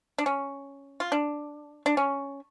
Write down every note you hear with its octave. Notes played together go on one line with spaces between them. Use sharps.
D4
C#4
F4
D4
D4
C#4